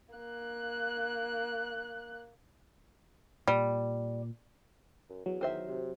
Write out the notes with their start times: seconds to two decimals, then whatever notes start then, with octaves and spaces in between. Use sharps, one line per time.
0.15 A#3 F#6
3.48 A#2 G3
5.10 F#2
5.26 E2 F#3
5.41 D#3 C5 E5
5.67 C3